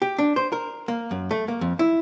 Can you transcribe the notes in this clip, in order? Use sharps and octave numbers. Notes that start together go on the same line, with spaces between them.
G4
D4
C5
A#4
A#3
F#2
A3
A#3
F2
E4